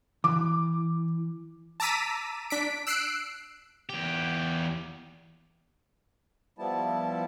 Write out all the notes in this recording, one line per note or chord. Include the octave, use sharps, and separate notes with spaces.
E3 D6
A5 A#5 D6 E6 B6 D#7
D4 B6 D7
E6 F#6 C7 D7
E2 G4
F3 G3 B3 E4 A5